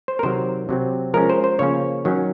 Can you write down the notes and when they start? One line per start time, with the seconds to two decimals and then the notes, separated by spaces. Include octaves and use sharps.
0.08 C5
0.19 A#4
0.23 C3 D#3 F#3 C5
0.69 C3 F#3 C4
1.14 F3 G#3 C#4 A#4
1.30 C5
1.44 C5
1.59 C#3 F3 A#3 C#4 C#5
2.05 D#3 F#3 C#4